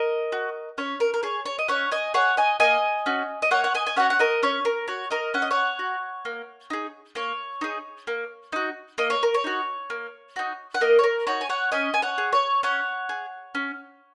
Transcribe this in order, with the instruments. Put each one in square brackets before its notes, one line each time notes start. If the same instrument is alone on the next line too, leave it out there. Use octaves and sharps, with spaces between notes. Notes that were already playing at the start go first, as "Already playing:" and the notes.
Already playing: [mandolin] A#4 D#5
F#4
C#4 C#5
A#4
A#4
G#4 C#5
C#5
D#5
C#4 C#5 F#5
D#5 G#5
G#4 C#5 F#5
D#5 G#5
A#3 D#5 G#5
C#4 F#4
D#5
A#3 C#5 F#5
F#5
D#5 G#5
G#5
C#4 F#4 C#5 F#5
F#5
A#4 D#5
C#4 C#5
A#4
F#4 C#5
A#4 D#5
C#4 F#5
D#5
C#5 F#5
F#4
A#3
D#4 G#4
A#3 C#5
D#4 G#4
A#3
D#4 F#4
A#3 D#5
C#5
A#4
C#5
D#4 F#4
A#3
D#4 F#4
F#5
A#3 A#4 D#5
C#5
A#4
D#4 F#4 C#5
G#5
C#5 F#5
C#4 D#5 G#5
G#5
C#5 F#5
G#4
C#5
C#4 C#5 F#5
G#4
C#4